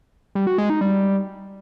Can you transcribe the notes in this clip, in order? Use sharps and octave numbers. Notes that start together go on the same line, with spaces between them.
G3
F#4
G#3
D#4
G3